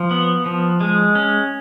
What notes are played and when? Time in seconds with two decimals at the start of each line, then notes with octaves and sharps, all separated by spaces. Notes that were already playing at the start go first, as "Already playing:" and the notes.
Already playing: F3
0.11 B3
0.46 F3
0.80 G#3
1.15 C#4